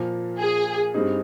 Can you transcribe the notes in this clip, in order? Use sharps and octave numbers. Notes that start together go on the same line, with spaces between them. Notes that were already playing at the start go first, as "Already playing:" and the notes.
Already playing: A#2 F3 A#3
G#4
G2 G3 C4 D#4 G#4